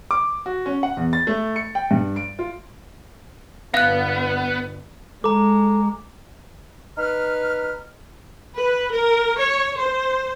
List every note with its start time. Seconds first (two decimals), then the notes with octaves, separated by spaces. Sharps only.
0.11 D6
0.46 F#4
0.66 C#4
0.83 F#5
0.97 E2
1.13 A6
1.27 A3
1.56 C#7
1.75 G5
1.91 G2
2.16 D7
2.39 F4
3.74 G1 B3 F5 F#6
5.24 G#3 A4 A#5 D6
6.98 D#4 B4 F6
8.56 B4
8.93 A#4
9.39 C#5
9.78 C5